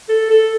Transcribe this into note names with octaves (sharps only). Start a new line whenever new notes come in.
A4
A4